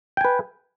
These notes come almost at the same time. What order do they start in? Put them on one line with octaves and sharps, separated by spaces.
G5 G#5 B4